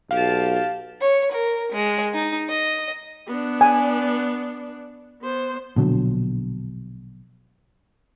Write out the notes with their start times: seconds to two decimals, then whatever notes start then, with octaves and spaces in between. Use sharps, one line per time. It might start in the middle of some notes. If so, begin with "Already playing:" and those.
0.11 B1 G4 F5 A5
1.01 C#5
1.32 A#4
1.73 G#3
2.14 D#4
2.48 D#5
3.28 B3 D4
3.61 G#5
5.22 B3 C5
5.76 A#1 B2 D3 F#3